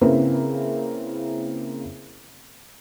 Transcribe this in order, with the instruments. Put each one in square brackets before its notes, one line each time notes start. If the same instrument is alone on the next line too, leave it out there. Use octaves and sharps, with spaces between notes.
[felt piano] C#3 A#3 C4 E4 A#4 B4